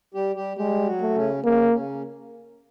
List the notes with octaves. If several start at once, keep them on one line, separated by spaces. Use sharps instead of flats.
G3 G4
G3 G4
G3 G#3 G4
F#3 F#4
A3
C#3 C#4
C#3 A#3 C#4
C#3 C#4